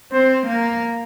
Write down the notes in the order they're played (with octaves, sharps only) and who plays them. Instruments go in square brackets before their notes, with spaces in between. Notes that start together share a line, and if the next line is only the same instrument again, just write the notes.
[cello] C4 [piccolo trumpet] C5
[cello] A#3